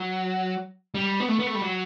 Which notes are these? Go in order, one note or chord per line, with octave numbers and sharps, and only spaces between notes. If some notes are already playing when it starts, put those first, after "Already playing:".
Already playing: F#3
G3
B3
A3
B3
A3
G3
F#3